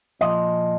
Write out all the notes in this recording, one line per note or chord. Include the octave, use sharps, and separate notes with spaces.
A#2 F3 D#5